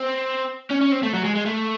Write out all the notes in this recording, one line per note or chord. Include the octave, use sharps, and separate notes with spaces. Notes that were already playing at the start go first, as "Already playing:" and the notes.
Already playing: C4
C#4
C#4
C4
A3
F#3
G#3
G#3
A3